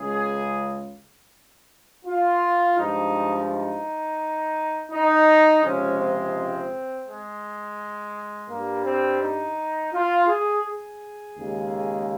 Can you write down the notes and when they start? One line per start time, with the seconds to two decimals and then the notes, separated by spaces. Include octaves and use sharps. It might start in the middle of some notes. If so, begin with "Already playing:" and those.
Already playing: C#2 C#3 G#3 G#4
2.05 F4
2.76 G2 F3 G#3 D#4
3.48 D#4
4.91 D#4
5.63 C#2 C3 F3 G#3 C#4
5.98 C4
6.34 C4
7.06 G#3
8.49 G2 G3 A#3
8.85 C4
9.21 D#4
9.92 F4
10.27 G#4
10.63 G#4
11.36 D#2 C#3 G#3